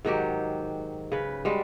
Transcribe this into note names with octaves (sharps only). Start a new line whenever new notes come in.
G#2 D#3 F#3 G4
C#3 B4
G3 G#3 F#4